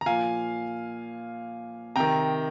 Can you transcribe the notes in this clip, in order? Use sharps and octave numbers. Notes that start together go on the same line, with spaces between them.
A#5
A#2 F3 F5 G#5
C3 D#3 G5 A#5